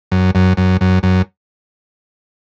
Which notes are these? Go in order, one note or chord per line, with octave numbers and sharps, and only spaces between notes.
F#2
F#2
F#2
F#2
F#2